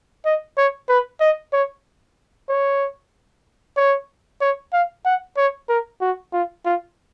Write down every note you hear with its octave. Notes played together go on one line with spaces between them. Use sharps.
D#5
C#5
B4
D#5
C#5
C#5
C#5
C#5
F5
F#5
C#5
A#4
F#4
F4
F4